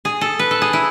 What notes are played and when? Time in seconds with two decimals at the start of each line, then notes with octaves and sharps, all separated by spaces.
0.05 G#4
0.21 A4
0.39 B4
0.51 A4
0.62 G#4
0.73 E4